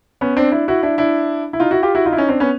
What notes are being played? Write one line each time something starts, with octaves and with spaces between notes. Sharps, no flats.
B3 C#4
C4 D4
D4 E4
E4 F#4
D4 E4
D4 E4
E4
D#4 F4
E4 F#4
F4 G4
E4 F#4
D#4 F4
E4
C#4 D#4
C4 D4
B3 C#4